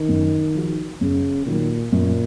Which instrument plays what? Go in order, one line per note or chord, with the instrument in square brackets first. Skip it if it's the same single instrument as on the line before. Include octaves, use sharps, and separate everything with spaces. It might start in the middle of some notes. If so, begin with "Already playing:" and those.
Already playing: [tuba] D#3
[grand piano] F#2
F3 G#3 D#4 F#4
[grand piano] F#2 [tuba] C#3
[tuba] A#2 [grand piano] D#3 F#3
[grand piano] F#2 [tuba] A#2